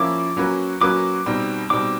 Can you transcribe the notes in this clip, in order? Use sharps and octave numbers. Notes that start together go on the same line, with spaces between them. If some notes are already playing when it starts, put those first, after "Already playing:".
Already playing: F3 A#3 C#4 E4 D6
F#3 A#3 C#4 F#4 B4
F#3 A#3 C#4 F#4 B4 D6
B2 G3 C4 D#4
B2 G3 C4 D#4 D6